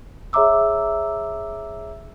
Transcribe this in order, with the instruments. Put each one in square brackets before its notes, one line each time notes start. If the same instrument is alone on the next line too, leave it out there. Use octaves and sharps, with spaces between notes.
[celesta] G#4 C#5 E5 A#5 D6 E6